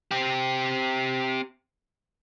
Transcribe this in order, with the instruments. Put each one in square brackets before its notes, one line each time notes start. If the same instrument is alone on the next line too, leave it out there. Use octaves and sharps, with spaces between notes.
[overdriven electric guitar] C4 G4